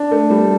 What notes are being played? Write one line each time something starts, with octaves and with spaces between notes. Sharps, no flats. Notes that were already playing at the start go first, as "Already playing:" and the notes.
Already playing: D4
A3
G3